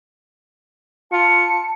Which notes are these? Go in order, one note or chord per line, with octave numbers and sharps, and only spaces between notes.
F4 A5 C#7